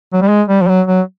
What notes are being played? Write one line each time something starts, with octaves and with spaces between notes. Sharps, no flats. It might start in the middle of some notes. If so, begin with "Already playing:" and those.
F#3
G3
G#3
G3
F3
F#3
F#3